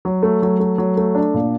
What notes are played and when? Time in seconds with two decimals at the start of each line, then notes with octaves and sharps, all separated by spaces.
0.05 F#3
0.23 A3
0.42 F#3
0.60 A3
0.78 F#3
0.97 A3
1.15 D4
1.34 A#2